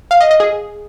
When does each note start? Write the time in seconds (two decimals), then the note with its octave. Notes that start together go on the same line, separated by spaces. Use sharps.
0.11 F5
0.21 D#5
0.31 D#5
0.40 G#4